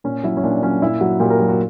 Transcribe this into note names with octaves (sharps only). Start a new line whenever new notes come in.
A#2 C#4
F#3 E4
C#4
A#2 D4
F#3 C#4
A#2 E4
F#3 F#4
A#2 G4
A#4
F#3 G4
F#4